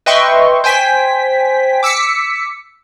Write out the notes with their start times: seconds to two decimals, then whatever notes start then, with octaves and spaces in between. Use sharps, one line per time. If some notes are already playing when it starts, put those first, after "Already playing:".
0.06 B4 D#5 E5 G5 C6 C#6
0.64 C5 G5 G#5 B6
1.83 D6 E6 B6 C#7